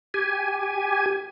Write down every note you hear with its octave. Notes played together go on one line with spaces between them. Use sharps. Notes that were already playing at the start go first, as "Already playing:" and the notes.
G4 G#5